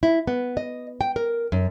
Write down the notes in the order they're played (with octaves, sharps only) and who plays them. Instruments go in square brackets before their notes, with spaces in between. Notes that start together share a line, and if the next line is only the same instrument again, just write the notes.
[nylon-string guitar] E4
B3
D#5
G5
A#4
F#2